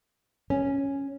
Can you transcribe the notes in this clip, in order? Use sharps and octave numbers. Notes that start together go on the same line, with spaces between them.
C#4